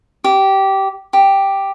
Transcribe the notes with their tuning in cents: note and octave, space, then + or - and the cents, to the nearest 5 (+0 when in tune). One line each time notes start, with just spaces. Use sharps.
G4 -15
G4 +0